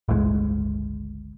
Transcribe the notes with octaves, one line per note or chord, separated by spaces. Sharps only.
G1 C#2 A2 G#3